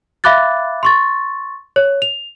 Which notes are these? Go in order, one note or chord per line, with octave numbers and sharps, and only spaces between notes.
E5 F5 B5 D6 F#6 A6
C6 C#6 A6
C#5
F7